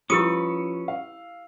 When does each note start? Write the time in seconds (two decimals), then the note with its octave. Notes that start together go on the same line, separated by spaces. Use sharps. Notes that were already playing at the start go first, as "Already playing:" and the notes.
0.10 F3 C#4 E4 G4 B4 C#6 D#6 E6
0.88 F5